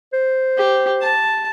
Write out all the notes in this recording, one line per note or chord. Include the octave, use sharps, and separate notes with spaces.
C5
G4
A5